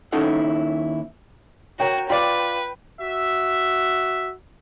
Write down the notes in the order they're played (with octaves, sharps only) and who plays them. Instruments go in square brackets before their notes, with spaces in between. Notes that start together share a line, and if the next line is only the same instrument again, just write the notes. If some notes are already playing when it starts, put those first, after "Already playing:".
[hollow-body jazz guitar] D#2 C#4 D#4 E4 A4 F#5
[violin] F#4 [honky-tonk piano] A#4 C#5 G5
[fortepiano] F4 D5 [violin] B4 [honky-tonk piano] G5
[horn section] F#4 E5